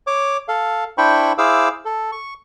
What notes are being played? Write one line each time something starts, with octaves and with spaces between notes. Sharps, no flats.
C#5 D6
A4 F5
D4 E4 C5 G5 B5 C#6
E4 G#4 C5 F5 D6 E6
A4
C#6